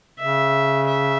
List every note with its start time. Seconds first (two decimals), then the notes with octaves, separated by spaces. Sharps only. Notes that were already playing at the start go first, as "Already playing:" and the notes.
0.19 C#3 E5
0.88 E5